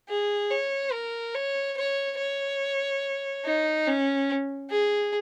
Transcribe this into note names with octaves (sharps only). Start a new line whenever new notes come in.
G#4
C#5
A#4
C#5
C#5
C#5
D#4
C#4
G#4